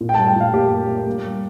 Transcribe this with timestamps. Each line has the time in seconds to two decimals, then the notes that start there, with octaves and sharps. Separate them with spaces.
0.01 A#2
0.09 G5
0.14 G3 A5
0.28 G5
0.36 A#2 F5
0.53 A#3 G4
0.71 A#3
0.89 A#3
1.07 A#3
1.24 G3